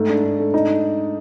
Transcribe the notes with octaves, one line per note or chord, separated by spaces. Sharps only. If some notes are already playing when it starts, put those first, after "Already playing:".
Already playing: G#2 A3
D4
G#2
A3
D#4